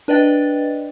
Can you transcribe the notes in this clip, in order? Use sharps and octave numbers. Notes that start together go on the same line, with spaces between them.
D4 B4 D5 D#5 G5 A6